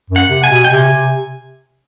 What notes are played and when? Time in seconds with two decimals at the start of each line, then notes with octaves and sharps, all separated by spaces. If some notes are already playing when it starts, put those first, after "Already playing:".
0.10 F#2
0.16 F#5
0.29 C3
0.44 G#5
0.49 B2
0.64 G5
0.70 C3 G#5
0.91 C3